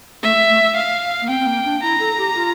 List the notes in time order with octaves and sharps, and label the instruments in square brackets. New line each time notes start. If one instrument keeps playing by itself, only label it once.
[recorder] A3 [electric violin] E5
[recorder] A3
[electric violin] F5
[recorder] A#3
[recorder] C4 [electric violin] G5
[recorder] C4
A#3
D4
[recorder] E4 [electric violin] A#5
[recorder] A4
G4
F4